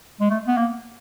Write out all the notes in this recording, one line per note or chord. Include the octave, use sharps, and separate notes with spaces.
G#3
A3
B3
A#3